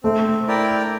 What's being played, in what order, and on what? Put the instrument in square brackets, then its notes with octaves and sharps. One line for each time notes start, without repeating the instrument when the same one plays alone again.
[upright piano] A3 [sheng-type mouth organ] C4
[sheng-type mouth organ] E4 A#4 D5 G5